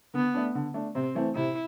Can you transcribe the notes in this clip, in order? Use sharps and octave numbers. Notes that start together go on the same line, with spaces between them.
D3 B3
A3 D4
D3
A3 D4
C3 C4
E3 A3 C4
C3 E4